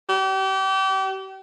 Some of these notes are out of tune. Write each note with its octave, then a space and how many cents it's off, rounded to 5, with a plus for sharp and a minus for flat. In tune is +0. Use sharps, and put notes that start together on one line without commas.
G4 -35